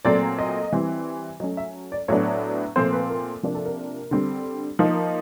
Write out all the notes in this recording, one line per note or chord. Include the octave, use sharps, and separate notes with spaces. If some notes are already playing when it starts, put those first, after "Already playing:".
A#2 F#3 A3 C4 D5
D#5
E3 G3 C4
F#3 A3 C#4 D#5
E5
D5
A2 F#3 B3 D4 C#5
A#2 F3 A3 C4 C5
B4
A#4
C3 F3 A#3 D4 A#4
A4
A#4
D3 G3 C4
F3 A#3 D#4